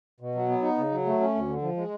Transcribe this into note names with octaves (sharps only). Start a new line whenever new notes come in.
B2
F#3
B3
D#4
C#3
F#3
A3
C#4
D2
D3
F3
G#3